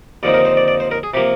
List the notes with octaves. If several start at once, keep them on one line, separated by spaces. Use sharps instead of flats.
D#2 D3 F3 C4 D#4 D5
A#4
C5
D5
D5
C5
A#4
G#4
C3 F3 A#3 G4